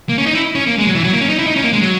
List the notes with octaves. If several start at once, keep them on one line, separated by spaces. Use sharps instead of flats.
A#3
C#4
D#4
E4
C#4
A#3
G#3
F#3
E3
F#3
A#3
C#4
D#4
E4
D#4
C#4
A#3
G#3
F#3